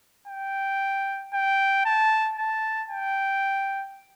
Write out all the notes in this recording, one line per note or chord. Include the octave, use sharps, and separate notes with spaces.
G5
G5
A5
A5
G5